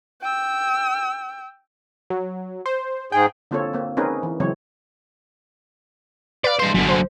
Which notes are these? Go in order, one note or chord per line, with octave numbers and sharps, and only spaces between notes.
G5 E6
F#3
C5
G#2 G#4 G5
D3 A#3 C4 F4 A4 C#5
A#3 C4
C4 C#4 D#4 G#4 A#4 B4
E3
C#3 E3 F#3 G#3 C4 C#5
B4 D5 F5
G2 C5 C6
G1 F#2 D3
C5